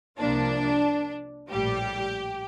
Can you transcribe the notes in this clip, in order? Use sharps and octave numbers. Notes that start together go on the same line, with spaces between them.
C2 C3 F3 A#3 D4
A#1 A2 G3 G4